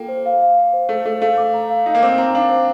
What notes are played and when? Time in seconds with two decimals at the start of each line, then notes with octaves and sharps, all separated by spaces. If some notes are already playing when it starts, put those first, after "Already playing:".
Already playing: A#3 F4 A4 G5
0.09 C5
0.26 F5
0.41 F5
0.57 F5
0.73 C5
0.89 A3 C5
1.06 A3 C5
1.21 A3 F5
1.37 D6
1.54 A#5
1.69 F5
1.86 D#4 F5
1.95 A#3
2.02 C4 D6
2.18 C4 A#5
2.35 D4 F5
2.50 C5